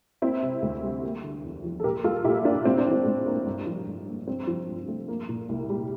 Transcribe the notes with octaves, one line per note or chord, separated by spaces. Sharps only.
A#3 C4 E4
C3
D2
G3
A#3
D3
E2
F3
A4
A#2 G4 A#4
G3 F4 A4
A#2 E4 G4
A#3 D4 F4
A2 C4
D4
E3
C4
A2
A#3
G2
F3
G2
A#3
G2 C4
F3
G2
A3
A#3
A#2
C2
G3